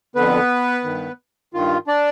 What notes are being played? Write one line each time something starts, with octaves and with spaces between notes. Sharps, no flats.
F2 D3 B3 B4
G2 D#3
G2 D#3 F4
D4 D5